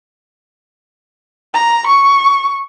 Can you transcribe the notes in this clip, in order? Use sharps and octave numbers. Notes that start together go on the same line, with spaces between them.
A#5
C#6